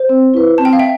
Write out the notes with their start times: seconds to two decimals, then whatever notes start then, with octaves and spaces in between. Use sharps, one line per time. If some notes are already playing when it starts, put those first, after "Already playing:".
Already playing: C5
0.09 C4
0.34 E4 B4
0.58 C4 A5
0.65 G5
0.73 F5
0.79 E5 G5